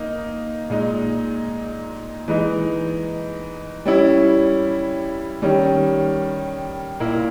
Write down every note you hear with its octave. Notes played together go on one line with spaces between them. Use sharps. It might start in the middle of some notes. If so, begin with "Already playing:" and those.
Already playing: A#3 D#4
A#2 G#3 D#4
E3 G#3 D#4
G3 C#4 E4
D#3 G3 C#4
A#2 A#3 E4